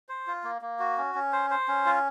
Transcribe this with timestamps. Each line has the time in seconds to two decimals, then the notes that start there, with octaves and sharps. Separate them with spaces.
0.09 C5
0.27 F4
0.44 A#3
0.62 A#3
0.79 F#4
0.98 C#4
1.15 C#4
1.33 C5
1.50 C5
1.68 C#4
1.86 F4